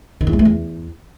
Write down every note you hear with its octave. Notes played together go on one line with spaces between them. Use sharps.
D#3
E2
G#3
A3
E2